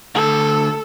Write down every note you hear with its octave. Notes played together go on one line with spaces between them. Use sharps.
D2 A4